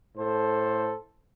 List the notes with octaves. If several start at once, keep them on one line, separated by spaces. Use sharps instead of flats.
A2 A4 C5